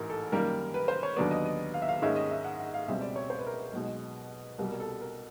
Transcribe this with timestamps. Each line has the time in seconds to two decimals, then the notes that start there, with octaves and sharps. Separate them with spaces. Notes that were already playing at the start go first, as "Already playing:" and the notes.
Already playing: A1 G#2 E3 A#4
0.10 A4
0.32 F#2 D#3 G3 A#3 A#4
0.74 B4
0.88 C5
1.03 C#5
1.16 D#2 D3 F#3 B3 D5
1.31 D#5
1.46 D#5
1.74 F5
1.82 E5
1.89 F5
2.02 G#2 D#3 G#3 C#4 E5
2.16 D#5
2.31 E5
2.44 F#5
2.60 F#5
2.74 F5
2.88 C#2 B2 G3 C4 E5
3.01 D5
3.16 C#5
3.30 C5
3.39 B4
3.46 A#4
3.54 B4
3.73 B1 B2 G#3
4.58 C2 B2 G3 A#4
4.72 A#4
4.80 A4
5.01 A#4